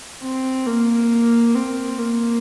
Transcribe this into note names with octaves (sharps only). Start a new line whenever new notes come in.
C4
A#3
C4
A#3